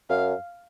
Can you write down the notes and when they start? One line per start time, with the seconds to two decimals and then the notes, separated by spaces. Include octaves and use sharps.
0.10 F#2 F5